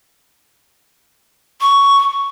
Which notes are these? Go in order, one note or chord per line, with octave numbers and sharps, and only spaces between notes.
C#6